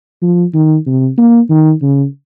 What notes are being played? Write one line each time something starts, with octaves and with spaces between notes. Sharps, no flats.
F3
D#3
C3
A#3
D#3
C#3